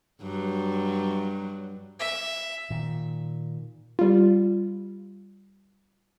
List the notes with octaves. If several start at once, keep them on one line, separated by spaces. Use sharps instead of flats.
G2 F#3
E5
A#2 D#3
G3 F4